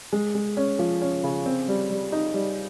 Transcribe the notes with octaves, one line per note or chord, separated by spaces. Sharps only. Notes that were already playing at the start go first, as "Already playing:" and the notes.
G#3
G#3
C#4
F3
C#4
C#3
C4
G3
G3
D#4
G3